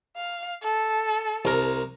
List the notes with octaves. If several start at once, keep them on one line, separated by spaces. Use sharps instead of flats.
F5
A4
C2 A#4